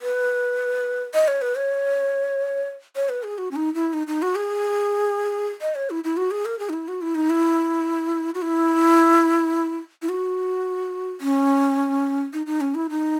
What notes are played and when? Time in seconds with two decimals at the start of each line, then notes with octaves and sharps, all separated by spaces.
0.02 B4
1.14 D#5
1.28 C#5
1.41 B4
1.55 C#5
2.96 C#5
3.09 B4
3.23 G#4
3.38 F#4
3.51 C#4
3.56 D#4
3.75 E4
3.93 D#4
4.07 D#4
4.22 F#4
4.35 G#4
5.61 D#5
5.75 C#5
5.90 E4
6.04 E4
6.17 F#4
6.31 G#4
6.45 A#4
6.59 G#4
6.69 D#4
6.73 E4
6.88 F#4
7.02 E4
7.15 D#4
7.30 E4
8.34 F#4
8.42 E4
10.02 E4
10.09 F#4
11.21 C#4
12.33 D#4
12.46 D#4
12.61 C#4
12.75 E4
12.89 D#4